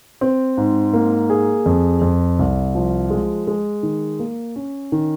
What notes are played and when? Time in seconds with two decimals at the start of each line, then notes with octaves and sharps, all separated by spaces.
0.21 C4
0.57 G#2
0.93 A#3
1.30 G#4
1.66 F2
2.01 F2
2.39 C2
2.75 F3
3.10 G#3
3.47 G#3
3.83 D#3
4.19 A#3
4.56 C#4
4.92 D#3